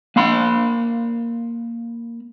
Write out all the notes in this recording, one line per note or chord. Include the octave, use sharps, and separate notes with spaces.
A#3 F5 B5 C6